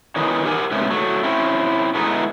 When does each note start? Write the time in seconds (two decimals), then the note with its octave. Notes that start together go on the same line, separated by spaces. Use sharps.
0.16 D#3 E3 B3 C#4 D#4
0.45 G4 A#4 F#5 G#5
0.71 G#2 C3 A3 B3 C#4
0.90 F#3 A3
1.23 C4 C#4 E4
1.95 E3 G#3 A3 B3 D#4